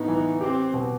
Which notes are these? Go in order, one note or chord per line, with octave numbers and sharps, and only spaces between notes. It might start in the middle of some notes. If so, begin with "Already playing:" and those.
Already playing: A2 B3 D#4
E3
C4 G4
B2